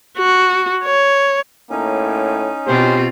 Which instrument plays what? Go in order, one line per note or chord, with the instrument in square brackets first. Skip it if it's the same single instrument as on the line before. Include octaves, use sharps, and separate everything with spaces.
[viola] F#4
C#5
[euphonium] A2 [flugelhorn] A#3 [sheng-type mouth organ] C#4 D#4
[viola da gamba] B2 C4 F4 [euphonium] G4 [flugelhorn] C5